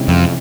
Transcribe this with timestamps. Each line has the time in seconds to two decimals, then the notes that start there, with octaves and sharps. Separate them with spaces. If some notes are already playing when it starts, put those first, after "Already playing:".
Already playing: C3 E3 G#3 C#4
0.08 F2